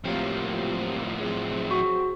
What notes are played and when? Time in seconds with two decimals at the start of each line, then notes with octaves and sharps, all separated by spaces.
0.04 A2 F3 F#3 A#3 C4 F4 G4 C#5
1.19 F#3 C4 G#4
1.71 F#4